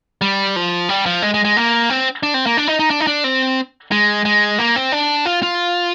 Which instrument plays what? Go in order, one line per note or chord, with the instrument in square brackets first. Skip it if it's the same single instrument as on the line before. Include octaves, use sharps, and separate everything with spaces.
[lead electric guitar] G3
F3
G3
F3
G#3
G#3
G#3
A#3
C4
D4
C4
A#3
D4
D#4
D#4
D4
D#4
D4
C4
G#3
G#3
A#3
C4
D4
F4
F4